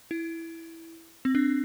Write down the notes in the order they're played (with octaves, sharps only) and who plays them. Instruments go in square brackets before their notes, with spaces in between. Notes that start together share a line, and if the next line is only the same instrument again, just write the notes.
[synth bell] E4
C4
D4